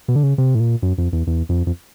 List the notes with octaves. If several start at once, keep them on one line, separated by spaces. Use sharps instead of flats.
B2
D3
C#3
C3
A2
A#2
F#2
F2
E2
E2
F2
F2